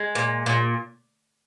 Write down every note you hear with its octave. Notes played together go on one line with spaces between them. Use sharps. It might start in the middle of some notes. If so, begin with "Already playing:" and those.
Already playing: G#3
A#2
A#2